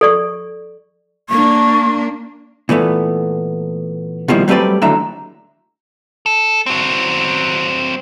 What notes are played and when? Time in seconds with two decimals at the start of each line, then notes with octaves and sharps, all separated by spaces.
0.01 A4 D5 C#6
1.30 A#3 D4 C#6
2.69 A#2 E3 A3 B3
4.28 B2 D#3 F3 G3 A#3 E4
4.48 F#3 G3 A3 C4 B4 D5
4.82 D#2 A2 D3 F#3 E5 A#5
6.26 A4
6.66 F#3 C4